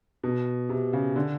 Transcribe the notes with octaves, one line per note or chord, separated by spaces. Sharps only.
B2
C3
C#3
D3